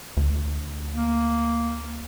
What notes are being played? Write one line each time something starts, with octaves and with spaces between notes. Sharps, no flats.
D2
A#3